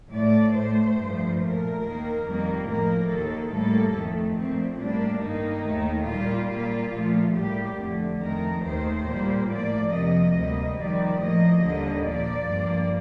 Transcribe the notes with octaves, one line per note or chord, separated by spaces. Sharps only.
A2 A3 D5
A2 A3 C5
G2 F3 A3
A#2 A3 A#4
D#2 D#3 A#3
F2 D#3 G3 A#3
A2 F3 A#3 A#4
D#2 D#3 A#3 A4
A2 G3 A#3 A4
F2 D#3 A3
A#2 F3 A3 C4
A2 G3 A#3 D4
G2 D#3 A#3 D#4
D#2 D#3 A3
A#2 G3 A#3 F4
A#2 G3 A#3 F4
A#2 F3 A3
A2 G3 A#3 G4
F2 D3 A3
F2 D#3 A3 A#4
D#2 D#3 A3 C5
A#2 G3 A#3
A2 F3 A#3 D5
F2 C3 F3 A#3 D#5
D2 C3 G3 A#3
F2 D#3 G3 D5
A2 F3 A#3 D#5
D#2 D3 G3 A#3
A#2 F3 A#3 D5
G2 F3 A#3